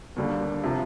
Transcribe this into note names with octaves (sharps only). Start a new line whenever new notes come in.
D#2 D3 G3 A#3
C3 F3